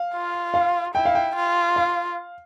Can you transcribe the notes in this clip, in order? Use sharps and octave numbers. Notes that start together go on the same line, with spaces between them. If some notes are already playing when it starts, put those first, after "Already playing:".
Already playing: F5
F4
F5
E4 G5
F5
G5
F4
F5